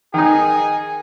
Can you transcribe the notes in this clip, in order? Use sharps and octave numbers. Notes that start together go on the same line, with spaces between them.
D#3 D#4 G#4